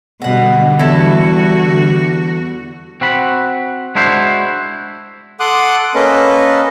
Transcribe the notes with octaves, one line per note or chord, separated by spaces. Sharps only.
B2 D3 G3 F#4 F#5
E2 E4 F#4 A4
C4 F#4 B5
G#3 D4 E4 F#4 C5
A4 F#5 C6 D6 D#6 F#6
A#3 C#4 A4 B4 D#5